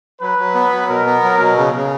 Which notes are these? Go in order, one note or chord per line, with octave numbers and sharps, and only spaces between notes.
F#3 B4
F#3
B3
F#3
B2 A#4
B3
F#3
B2
C#3
C#3